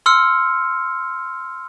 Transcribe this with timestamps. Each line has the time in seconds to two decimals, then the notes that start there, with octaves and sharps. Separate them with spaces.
0.06 C6 E6 F6 C#7